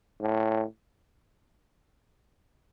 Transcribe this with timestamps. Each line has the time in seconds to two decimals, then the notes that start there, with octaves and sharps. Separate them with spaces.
0.21 A2